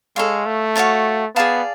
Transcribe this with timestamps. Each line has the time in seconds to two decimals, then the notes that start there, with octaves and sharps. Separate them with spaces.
0.16 G#3 A4 C#5 F5
0.46 A3
0.76 F#4 C#5 F5 A5
1.35 B3 G#4 D5 F5 A5